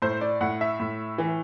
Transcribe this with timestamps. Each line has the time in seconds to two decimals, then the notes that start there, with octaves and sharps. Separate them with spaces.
0.02 A2 C5
0.21 D5
0.41 A2 F#5
0.61 E5
0.80 A2
1.18 E3